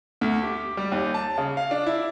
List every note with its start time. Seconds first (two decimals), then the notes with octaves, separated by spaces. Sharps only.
0.21 D2
0.43 G4
0.77 G3
0.92 D#2
1.14 A5
1.38 C#3
1.57 F5
1.71 D4
1.86 E4